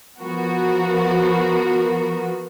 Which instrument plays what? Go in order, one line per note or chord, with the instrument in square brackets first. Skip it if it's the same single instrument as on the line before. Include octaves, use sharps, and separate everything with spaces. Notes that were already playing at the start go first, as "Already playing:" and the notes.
[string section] F3 B3 F#4 A#4